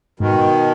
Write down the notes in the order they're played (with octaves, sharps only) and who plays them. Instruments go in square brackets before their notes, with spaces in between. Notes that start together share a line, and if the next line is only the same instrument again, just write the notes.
[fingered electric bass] G#2 [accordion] B2 D#3